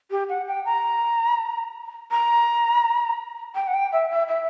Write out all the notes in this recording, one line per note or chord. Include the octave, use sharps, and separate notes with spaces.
G4
F#5
G5
A#5
A#5
G5
F#5
G5
E5
E5
E5